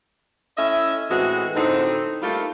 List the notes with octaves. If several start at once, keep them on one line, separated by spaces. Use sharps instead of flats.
A3 C#4 E4 D#5 E5
A2 E3 G#3 B3 C4 F#4
A2 D3 C4 D#4
G3 A3 A#3 D#4 F4